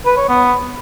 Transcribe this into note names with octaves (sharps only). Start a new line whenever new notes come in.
B4
C#5
B3